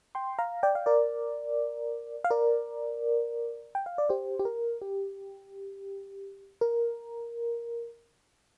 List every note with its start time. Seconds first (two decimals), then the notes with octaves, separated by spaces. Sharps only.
0.15 G5 C6
0.39 F5 A#5
0.63 D5 G5
0.75 F5
0.86 A#4 D5
2.24 F5
2.31 A#4 D5
3.75 G5
3.86 F5
3.98 D5
4.09 G4 C5
4.39 G4
4.45 A#4
4.82 G4
6.61 A#4